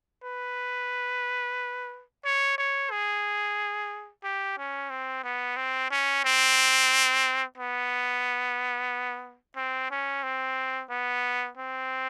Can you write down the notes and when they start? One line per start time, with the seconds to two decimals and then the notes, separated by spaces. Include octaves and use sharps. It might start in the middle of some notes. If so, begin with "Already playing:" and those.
0.24 B4
2.24 C#5
2.58 C#5
2.91 G#4
4.24 G4
4.57 C#4
4.90 C4
5.24 B3
5.56 C4
5.90 C#4
6.24 C4
7.57 B3
9.56 C4
9.91 C#4
10.23 C4
10.90 B3
11.57 C4